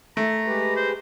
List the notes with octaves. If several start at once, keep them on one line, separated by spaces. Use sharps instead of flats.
A3 A#5
G#3 G4 B4
C5